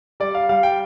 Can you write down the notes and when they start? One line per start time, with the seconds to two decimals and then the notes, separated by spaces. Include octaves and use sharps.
0.20 G3 D5
0.35 F5
0.49 G3 F5
0.63 G5